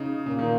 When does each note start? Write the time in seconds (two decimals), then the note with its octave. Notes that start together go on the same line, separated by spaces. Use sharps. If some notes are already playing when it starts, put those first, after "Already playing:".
Already playing: C#3 D#4
0.26 A#2 C#3 A#3
0.39 D#3